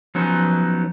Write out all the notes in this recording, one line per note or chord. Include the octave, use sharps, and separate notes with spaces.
F3 F#3 B3 C#4 D#4